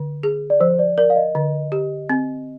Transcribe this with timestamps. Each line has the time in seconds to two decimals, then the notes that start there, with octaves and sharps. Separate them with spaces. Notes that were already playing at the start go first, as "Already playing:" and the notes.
Already playing: D3
0.23 G#4
0.50 D5
0.60 F3 C5
0.79 D5
0.98 A#4 D5
1.10 F5
1.16 D#5
1.35 D3
1.72 G4
2.09 C4